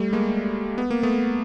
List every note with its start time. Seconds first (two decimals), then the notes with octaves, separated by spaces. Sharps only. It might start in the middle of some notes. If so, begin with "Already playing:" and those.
Already playing: G3 A3
0.13 G#3 A#3
0.78 B3
0.91 A#3
1.03 A3 B3